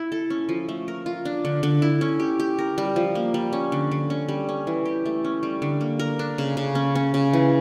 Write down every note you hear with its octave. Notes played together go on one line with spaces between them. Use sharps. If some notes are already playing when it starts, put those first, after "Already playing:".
Already playing: E4
A4
C#4
F3
A3
A#4
F4
D4
D3
D3
E4
C#4
G4
G4
A#4
G3
F3
A#3
G3
C#4
D3
D3
C#4
G3
C#4
E3
G4
A3
C#4
G3
D3
A#3
A#4
D4
C#3
C#3
C#4
C#4
C#3
E3